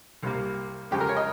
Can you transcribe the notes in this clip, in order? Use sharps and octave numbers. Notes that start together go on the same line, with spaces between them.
C2 C3 G3 A#3
F2 C#3 F3 G#3 G4
A#4
C#5
D#5